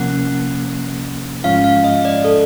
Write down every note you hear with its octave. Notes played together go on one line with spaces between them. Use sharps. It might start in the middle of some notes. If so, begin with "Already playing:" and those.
Already playing: C3 F3 A#3 C#4 F#5
G#2 F3 G#3 C#4 F4 F5
F5
D#5
D5
A4